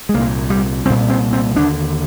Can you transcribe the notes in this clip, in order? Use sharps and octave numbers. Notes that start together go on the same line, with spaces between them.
G#3
C2 A#3
A#2
G3
C2 A#2 C4
C4
C4
D#2 D3 D4